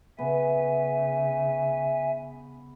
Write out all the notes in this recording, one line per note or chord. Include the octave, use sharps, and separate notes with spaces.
C#3 B3 E5 G#5